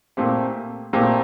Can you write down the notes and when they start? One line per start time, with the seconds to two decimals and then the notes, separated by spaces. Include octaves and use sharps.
0.17 A#2 A3 C4 G4 C5
0.93 A#2 A3 C4 G4 C5